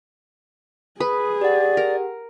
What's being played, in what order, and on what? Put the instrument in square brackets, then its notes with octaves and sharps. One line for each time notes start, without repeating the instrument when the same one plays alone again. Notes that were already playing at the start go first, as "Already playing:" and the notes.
[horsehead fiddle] G#4 [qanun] B4 [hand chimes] D#6
[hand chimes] G4 F#5 [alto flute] D5
[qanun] A#4